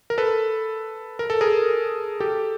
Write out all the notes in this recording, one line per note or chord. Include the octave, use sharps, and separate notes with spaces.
A#4
A4 B4
A#4
A4
G#4 A#4
G4 A4